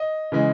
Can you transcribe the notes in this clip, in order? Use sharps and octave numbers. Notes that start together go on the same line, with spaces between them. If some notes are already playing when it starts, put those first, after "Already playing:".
Already playing: D#5
C#3 E3 G#3